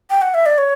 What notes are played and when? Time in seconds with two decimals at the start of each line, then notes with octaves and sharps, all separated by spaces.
0.10 G5
0.22 F#5
0.34 E5
0.46 D5
0.58 C#5